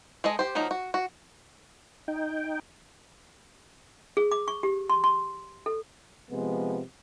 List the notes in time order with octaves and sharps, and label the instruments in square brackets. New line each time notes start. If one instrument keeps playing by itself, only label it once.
[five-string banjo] G#3 G#4 A4 D#5
G4 C5
F3 F#3 A#3 D#4
F#4
F#4
[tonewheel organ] D#4 G5
[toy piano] G#4
D6
C#6
G4
C6
C6
A4
[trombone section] C3 F3 G#3 B3